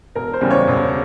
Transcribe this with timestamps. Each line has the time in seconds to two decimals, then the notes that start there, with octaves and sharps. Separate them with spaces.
0.15 E1 A#4
0.33 C5
0.41 E2 C#3 G3
0.50 C#5
0.67 E1